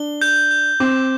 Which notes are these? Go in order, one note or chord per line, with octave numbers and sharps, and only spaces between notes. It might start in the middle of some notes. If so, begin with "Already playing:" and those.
Already playing: D4 G7
G6
G6
C4 D6